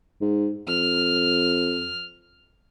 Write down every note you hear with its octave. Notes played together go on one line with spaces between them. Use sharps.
G#2
F2 F6